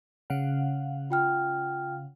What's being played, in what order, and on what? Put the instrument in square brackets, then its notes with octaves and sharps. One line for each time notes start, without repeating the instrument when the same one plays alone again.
[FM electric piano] C#3 F5 F#5
[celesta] F4 G5 F6